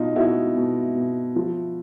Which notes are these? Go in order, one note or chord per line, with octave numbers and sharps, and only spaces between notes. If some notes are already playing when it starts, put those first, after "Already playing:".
Already playing: B2 D#4 F4
B2 E4 F#4
B2
B2
F3